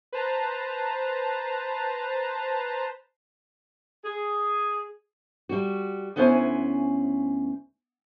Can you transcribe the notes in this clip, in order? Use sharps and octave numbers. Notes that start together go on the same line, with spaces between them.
B4 C5 A5 A#5
G#4
G3 F#4
D2 B3 C#4 E4 C5 G#5